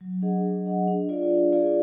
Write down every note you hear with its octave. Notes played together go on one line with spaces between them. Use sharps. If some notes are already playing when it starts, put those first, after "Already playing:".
F#3
D4 G#4 D#5 F#5
F#3
D4 G#4 D#5 F#5
D4
F4 G#4 D5 F5
D4
F4 G#4 D5 F5